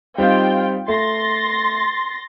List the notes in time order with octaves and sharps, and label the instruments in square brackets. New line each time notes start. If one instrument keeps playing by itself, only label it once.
[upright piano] G3 C4 D#4 [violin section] F4 G5
[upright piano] A3 [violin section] C6 A6 A#6